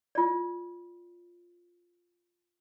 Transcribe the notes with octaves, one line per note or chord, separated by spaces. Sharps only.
F4 D5